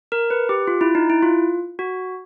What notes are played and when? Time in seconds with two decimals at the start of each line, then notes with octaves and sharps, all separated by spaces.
0.12 A#4
0.30 B4
0.49 G4
0.67 F4
0.81 E4
0.95 D#4
1.10 E4
1.23 F4
1.79 F#4